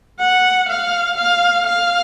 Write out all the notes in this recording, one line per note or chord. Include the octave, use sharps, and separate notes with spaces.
F#5
F5
F5
F5